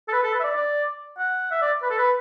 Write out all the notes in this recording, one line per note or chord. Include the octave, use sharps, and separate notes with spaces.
A4
B4
A4
B4
E5
D5
D5
F#5
E5
D5
B4
A4
B4